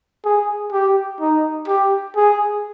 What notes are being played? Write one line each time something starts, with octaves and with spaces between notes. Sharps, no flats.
G#4
G4
D#4
G4
G#4